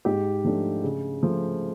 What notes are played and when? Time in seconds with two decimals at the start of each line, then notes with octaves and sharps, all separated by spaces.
0.05 G#2 G4
0.44 F3 A3 D4
0.83 C#3
1.23 F3 A3